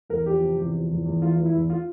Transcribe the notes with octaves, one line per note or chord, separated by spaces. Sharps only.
E2 A#4
F3 G4
C3
E2
F3
E2
E2
E3 F4
E3
E4
E2
F4